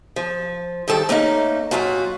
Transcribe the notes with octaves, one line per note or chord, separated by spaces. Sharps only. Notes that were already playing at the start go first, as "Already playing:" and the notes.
F3
G2 D#3 A4 G5
A3 A#3 C#4 D#4
F#2 A#2 F4 F#4